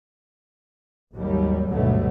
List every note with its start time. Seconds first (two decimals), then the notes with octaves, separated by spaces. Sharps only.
1.14 G#1 D#2 F#3 G3
1.68 G#1 D2 G2 B2 F#3 A3